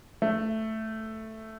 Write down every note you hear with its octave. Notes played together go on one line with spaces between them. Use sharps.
A3